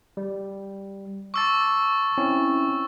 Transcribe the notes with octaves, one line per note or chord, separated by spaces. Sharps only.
G3
A5 C#6 D6 E6 A6
C4 C#4 E4